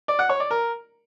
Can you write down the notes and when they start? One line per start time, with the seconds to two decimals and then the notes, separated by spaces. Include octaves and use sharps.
0.08 D5
0.19 F#5
0.29 C#5
0.40 D5
0.51 A#4